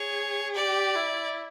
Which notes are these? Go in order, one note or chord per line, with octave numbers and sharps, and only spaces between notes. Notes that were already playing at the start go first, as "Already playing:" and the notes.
Already playing: G#4 C#5
G4 D5
E4